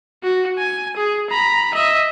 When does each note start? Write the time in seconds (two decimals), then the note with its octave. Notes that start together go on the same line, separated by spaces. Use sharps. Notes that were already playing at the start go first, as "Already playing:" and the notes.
0.23 F#4
0.58 G#5
0.97 G#4
1.30 A#5 B5
1.74 D#5 E5